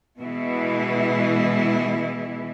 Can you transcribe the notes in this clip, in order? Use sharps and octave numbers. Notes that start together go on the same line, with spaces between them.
B2 E3 G#3 E4